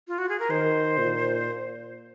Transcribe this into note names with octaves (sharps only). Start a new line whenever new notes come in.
F4
F#4
G#4
A#4
D#3 C5
A#2